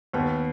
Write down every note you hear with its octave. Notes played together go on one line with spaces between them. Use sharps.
D#2 B3